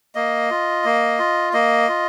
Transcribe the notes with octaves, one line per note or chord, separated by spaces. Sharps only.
A#3 D#5
F4
A#3
F4
A#3 D#5
F4